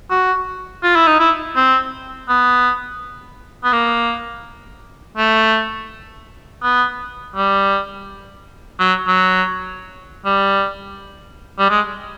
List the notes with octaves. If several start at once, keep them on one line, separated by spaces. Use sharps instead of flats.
F#4
F4
E4
D#4
E4
C4
B3
B3
A#3
A3
B3
G3
F#3
F#3
G3
G3
G#3